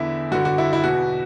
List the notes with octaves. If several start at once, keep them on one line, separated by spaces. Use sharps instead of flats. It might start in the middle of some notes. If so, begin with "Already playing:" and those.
Already playing: E2 D3 E4
G2 D3 F#4
F#4
E4
E4
E2 B2 F#4